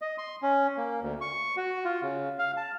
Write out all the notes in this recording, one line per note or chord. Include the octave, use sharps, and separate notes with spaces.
D#5
C6
C#4
A#3
D2
C#6
F#4
F4
C#3
F5
A5